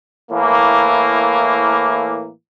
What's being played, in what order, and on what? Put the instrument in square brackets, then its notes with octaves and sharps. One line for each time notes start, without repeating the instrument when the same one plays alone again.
[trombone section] A2 E3 A#3